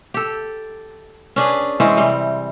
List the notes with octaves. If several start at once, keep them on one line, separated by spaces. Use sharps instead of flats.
G4 A4
C#4 D4 G#4 B4
E3 G#3 C4 C#4
C3 G3